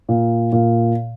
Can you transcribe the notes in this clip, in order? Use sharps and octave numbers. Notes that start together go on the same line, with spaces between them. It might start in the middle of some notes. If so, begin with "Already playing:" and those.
A#2
A#2